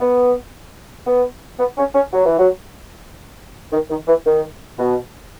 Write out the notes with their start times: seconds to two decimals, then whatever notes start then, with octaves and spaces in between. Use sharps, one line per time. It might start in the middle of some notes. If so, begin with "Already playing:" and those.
0.01 B3
1.07 B3
1.59 B3
1.78 C#4
1.95 C#4
2.13 F#3
2.26 E3
2.39 F#3
3.72 D#3
3.90 D#3
4.08 E3
4.26 D#3
4.79 B2